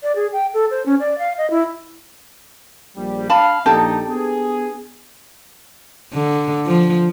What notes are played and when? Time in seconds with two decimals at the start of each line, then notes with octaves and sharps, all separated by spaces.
0.03 D5
0.15 G#4
0.33 G5
0.54 A4
0.71 C5
0.86 C#4
1.00 D5
1.19 F5
1.38 D#5
1.50 E4
2.96 A#1 G3
3.29 D4 F5 A5 B5
3.66 A#1 D4 D#4 G4 A4
4.08 B3 G#4
6.13 D3
6.67 F3